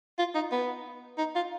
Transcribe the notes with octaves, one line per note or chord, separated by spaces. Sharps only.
F4
D#4
B3
D#4
F4